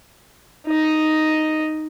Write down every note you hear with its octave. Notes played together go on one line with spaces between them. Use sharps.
D#4 D#5